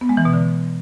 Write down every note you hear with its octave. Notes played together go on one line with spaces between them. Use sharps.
B3
G#3
E3
B2
D3